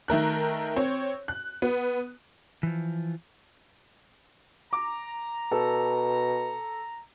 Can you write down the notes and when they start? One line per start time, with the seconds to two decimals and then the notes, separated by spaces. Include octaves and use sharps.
0.08 D#3 A3 A#4 F#6
0.76 C4 C#5
1.28 F#6
1.62 B3
2.63 E3 F3
4.73 A#5 D6
5.51 B2 A4